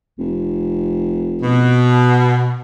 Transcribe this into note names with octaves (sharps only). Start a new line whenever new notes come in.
F1
B2